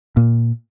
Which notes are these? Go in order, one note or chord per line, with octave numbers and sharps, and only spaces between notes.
A#2